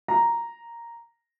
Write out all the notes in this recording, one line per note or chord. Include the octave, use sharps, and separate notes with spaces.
A#5